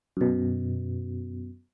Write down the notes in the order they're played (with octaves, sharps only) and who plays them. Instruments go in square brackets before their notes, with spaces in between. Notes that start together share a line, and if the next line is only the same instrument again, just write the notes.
[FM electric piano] F#2 B2